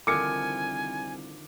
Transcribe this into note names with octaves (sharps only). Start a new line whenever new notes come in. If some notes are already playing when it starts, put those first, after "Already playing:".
C2 D3 D#3 F3 G#5 D6 C#7